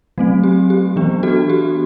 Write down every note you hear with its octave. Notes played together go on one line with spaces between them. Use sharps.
F#3 A3 C4
G4
G4
E3 B3 D4
F#4 A4
G4